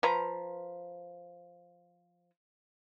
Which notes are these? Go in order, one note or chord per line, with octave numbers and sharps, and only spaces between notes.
F3 B4 A#5